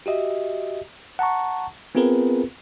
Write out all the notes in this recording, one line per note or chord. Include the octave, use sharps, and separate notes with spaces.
F#4 G4 D#5 E5
F#5 A5 A#5 C#6
B3 C4 F4 G#4 A#4 B4